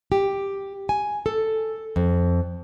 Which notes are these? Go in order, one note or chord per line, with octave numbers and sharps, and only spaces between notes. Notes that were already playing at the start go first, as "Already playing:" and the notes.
G4
G#5
A4
F2